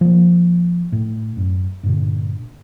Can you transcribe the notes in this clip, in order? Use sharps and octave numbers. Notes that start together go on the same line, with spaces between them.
F3 A#3
A2
F#2
G2 A#2 D3